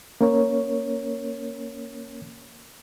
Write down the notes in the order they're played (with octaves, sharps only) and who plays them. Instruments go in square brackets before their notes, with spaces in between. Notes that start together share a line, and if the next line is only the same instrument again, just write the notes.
[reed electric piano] A#3 C#4 A#4 C#5